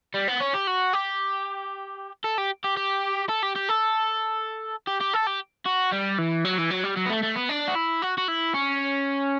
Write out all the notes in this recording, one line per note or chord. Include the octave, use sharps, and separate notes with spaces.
G3
B3
C#4
G4
F#4
G4
A4
G4
G4
G4
A4
G4
G4
A4
G4
G4
A4
G4
F#4
G3
E3
F#3
E3
F#3
G3
F#3
B3
A3
A3
B3
D4
F#4
E4
F#4
F#4
E4
C#4